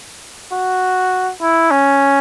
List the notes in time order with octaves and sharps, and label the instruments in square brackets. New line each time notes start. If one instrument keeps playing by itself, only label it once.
[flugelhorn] F#4
E4
C#4